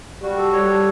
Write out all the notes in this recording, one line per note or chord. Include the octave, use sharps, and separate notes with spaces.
G3 F#4
A4
G3 C#5
A4